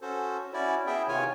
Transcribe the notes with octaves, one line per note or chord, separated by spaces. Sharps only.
C#4 F#4 A4 C5
C#4 E4 F#4 D5
B3 E4 G#4 E5 G5
C3 D#3 F4 C#5 G#5